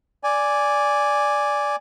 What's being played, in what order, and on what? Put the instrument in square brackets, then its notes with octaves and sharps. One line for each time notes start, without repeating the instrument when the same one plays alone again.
[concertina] D5 G#5